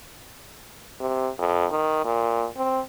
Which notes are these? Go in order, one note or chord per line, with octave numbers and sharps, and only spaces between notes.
C3
F2
D#3
A#2
C4